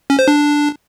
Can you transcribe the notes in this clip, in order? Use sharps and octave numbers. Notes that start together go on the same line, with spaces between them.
C#4
C5
D4